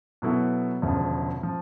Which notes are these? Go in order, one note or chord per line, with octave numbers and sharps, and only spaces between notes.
B2 F#3 B3 E4 A4
E1 D2 C#3 F3
F3